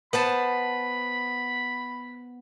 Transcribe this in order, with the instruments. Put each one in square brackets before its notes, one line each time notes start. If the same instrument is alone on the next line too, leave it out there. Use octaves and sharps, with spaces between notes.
[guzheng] B3 C5 A5 [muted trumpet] B5